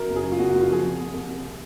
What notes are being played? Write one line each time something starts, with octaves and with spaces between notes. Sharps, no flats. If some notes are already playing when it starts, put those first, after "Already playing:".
Already playing: F#2 F#3 A#4
F#1
G#4
F#2
F4
F#1 F#4
F#1 F#4
F4
F3 G#4
C3
C2
C2
C3